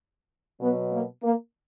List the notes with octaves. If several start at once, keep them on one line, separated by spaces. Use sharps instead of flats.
B2 F#3 B3
A#3
A#3